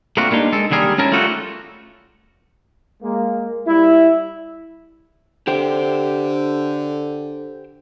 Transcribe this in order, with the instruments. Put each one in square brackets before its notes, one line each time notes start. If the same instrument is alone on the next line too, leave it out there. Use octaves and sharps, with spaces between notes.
[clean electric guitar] A3 A#3 C4 D4 F4 F#4
G3 A#3 D4 D#4
G#3 A4
D#2 D3 G3 G#4 A#4
G#2 C#4 E4 A#4 A5
G3 A3 F4 F#4 A4
[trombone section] G#3 A#3
G3 E4
[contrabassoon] D3 [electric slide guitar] G4 C5 G5